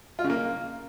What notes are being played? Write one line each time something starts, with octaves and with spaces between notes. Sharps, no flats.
F4
C#3
A#3